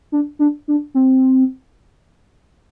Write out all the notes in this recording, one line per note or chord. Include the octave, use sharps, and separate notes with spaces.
D4
D4
D4
C4